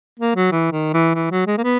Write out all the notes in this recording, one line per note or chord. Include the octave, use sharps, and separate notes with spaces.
A#3
F#3
E3
D#3
E3
E3
F#3
G#3
A#3
B3